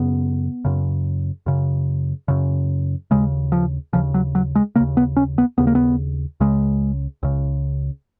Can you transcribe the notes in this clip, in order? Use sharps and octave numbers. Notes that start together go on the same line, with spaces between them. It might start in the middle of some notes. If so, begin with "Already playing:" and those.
Already playing: F#2 C#3 B3
F#2 C#3
F#2 C#3
F#2 C#3
D#2 C#3 G#3
F3
D#2 C#3 F3
F#3
F#3
G#3
D#2 C#3 A#3
B3
C#4
B3
D#2 C#3 B3
A#3
B3
C#2 C#3 G#3
C#2 C#3